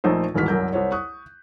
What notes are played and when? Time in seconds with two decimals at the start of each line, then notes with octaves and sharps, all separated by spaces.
0.04 A#1 A3 D#4 C5
0.34 D#1 G#2 E3 F#4 F6 B6
0.48 C2 F#2 A#4 G6
0.73 C2 C5 C#5
0.92 C#6 D#6 F#6